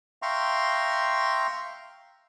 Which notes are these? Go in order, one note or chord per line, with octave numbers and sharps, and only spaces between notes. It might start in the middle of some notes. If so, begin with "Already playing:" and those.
E5 F5 G5 A#5 C6 C#6